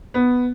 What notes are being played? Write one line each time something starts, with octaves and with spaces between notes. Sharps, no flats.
B3